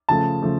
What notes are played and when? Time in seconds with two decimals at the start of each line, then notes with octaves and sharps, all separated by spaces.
0.09 C#3 F3 A3 A5
0.42 C#3 F3 A3